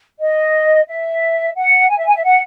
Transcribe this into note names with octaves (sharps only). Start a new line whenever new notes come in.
D#5
E5
F#5
G#5
E5
G#5
E5
F#5